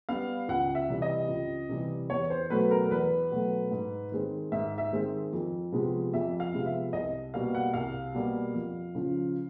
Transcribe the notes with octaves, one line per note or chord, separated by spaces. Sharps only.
G3 B3 F5
C#2 F#5
E5
C3 E3 G3
D#5
C#2
C3 E3 G3
E2 C#5
C5
B2 F#3 A3 B4
A#4
E2 B4
B2 F#3 A3
G#2
D#3 G#3 C4
G#2 E5
E5
D#3 G#3 C4
F2
C3 F3 G#3 B3
F2 E5
F5
C3 F3 G#3 B3
E5
C2 D#5
B2 G3 A#3 F5
F#5
C2 F5
B2 G3 A#3
F2
C#3 F3